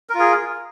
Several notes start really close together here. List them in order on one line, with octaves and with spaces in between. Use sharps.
A#4 F4 G#4